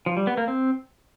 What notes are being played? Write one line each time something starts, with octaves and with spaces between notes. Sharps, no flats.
F3
G3
B3
A#3
C4